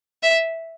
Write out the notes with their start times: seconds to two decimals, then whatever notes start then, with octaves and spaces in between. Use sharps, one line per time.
0.23 E5